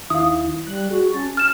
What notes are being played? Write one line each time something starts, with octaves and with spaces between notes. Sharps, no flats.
D#2 D#3 E4 F5 D#6
G3 F#6
F#4 G#4
C#4 A5
F6 E7